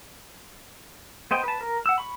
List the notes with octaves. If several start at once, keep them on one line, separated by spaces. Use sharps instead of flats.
B3 C5 D#5 G5
B4 A5
A#4
F#5 E6
B5 C#6